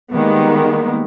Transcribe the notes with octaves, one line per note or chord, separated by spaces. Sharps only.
D#3 G3 G#3 A#3 B3